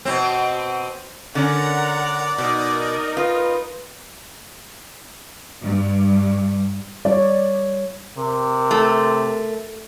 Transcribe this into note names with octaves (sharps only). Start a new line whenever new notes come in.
B2 C4
D3 C#4 A#4 D5 F#5 A#5
B2 D#4 A#4 D#5
F4 B4
G2
G3 C#5 D5
C3 A#4
A3